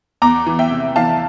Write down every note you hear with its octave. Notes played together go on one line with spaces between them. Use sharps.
E2 A#5 D6
E3
E5 G5
C3
E3 F5 A5